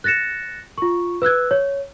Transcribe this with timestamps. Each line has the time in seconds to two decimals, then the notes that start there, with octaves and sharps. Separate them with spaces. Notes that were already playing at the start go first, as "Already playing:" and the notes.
0.04 F#6 A6 A#6 C#7 E7
0.78 F4 C#6
1.22 B4 E6 F#6 G#6
1.51 C#5